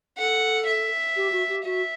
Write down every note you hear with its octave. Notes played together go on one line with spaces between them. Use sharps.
A4 F#5
E5
G4
F#4
G4
F#4 E5